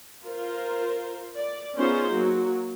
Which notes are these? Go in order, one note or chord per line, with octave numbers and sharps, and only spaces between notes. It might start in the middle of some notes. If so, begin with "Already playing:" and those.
F4 A#4 C5
D5
B3 C#4 D#4 F4 G#4 C5
F#3 A#3 F#4